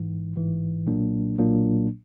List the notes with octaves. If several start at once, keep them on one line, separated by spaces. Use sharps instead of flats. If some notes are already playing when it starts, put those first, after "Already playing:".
Already playing: A1 G#2 E3
A1 G#2 E3
B1 A#2 F#3 A#3 D4
B1 A#2 F#3 A#3 D4